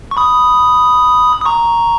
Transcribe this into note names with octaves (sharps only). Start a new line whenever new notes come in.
C#6
B5 D#6
D#6
A#5 C#6